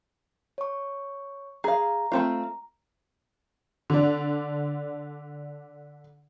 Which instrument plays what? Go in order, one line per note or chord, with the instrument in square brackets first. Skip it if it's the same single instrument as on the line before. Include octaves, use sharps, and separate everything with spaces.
[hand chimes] C#5 C#6
[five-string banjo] G#4 F5 [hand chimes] A#5
[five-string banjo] A3 C4 F4
[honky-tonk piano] D3 D4